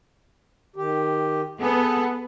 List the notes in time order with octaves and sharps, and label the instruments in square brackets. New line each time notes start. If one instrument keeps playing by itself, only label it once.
[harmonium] D#3 G4
[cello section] B3 [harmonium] G#4 A4